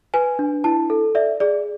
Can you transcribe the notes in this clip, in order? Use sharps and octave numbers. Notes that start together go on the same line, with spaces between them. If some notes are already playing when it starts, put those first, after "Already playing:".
B4 G#5
D4
E4 A5
A4
D5 E5
G#4 D5